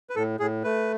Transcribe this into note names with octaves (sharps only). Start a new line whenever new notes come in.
B4
A2 A4
A2 G#4
A3 B4